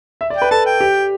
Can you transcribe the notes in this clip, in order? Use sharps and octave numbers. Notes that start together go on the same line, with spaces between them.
E5
D5
G5
B4
A4 A5
G5
G4